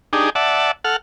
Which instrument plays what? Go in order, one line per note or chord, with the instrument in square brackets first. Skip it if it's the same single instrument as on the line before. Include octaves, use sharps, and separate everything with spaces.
[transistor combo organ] D4 D#4 G4 G#4
D5 E5 F#5 A5
A4 F#5 F6